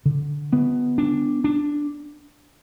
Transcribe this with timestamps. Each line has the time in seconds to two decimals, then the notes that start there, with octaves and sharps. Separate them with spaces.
0.06 D3
0.52 B3
0.98 D4
1.44 D4